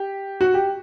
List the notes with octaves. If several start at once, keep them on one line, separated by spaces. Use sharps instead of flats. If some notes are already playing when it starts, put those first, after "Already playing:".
Already playing: G4
F#4
G4